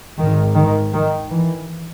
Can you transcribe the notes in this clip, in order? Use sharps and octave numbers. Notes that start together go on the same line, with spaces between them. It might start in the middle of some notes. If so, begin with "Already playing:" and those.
G#1 G#2 D#3
D#3
D#3
E3